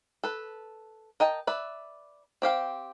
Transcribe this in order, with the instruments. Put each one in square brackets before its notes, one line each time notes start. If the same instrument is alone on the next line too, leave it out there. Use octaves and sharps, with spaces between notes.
[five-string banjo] A4 B4
A#4 D#5 G5 A5
B4 D5 E5
C4 G4 F5 G5